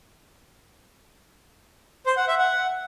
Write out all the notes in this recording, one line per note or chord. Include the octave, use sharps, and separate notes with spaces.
C5
F#5
E5
F#5